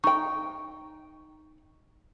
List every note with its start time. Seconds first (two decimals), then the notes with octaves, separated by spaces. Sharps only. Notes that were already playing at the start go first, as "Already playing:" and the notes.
0.04 D#4 G5 C#6